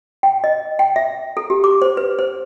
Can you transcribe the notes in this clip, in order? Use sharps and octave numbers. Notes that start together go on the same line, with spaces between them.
G5
D#5
G5
E5
A4
G4
D6
C5
B4
C5